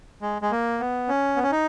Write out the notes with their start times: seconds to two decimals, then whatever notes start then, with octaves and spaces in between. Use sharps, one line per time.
0.22 G#3
0.42 G#3
0.51 A#3
0.80 B3
1.08 C#4
1.36 B3
1.43 C#4
1.52 D#4